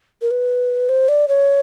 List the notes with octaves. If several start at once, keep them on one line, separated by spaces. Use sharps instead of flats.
A#4
B4
C5
D5
C#5